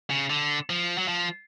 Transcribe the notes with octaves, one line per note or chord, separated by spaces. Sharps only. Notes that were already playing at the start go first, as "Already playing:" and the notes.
C#3
D3
F3
F#3
F3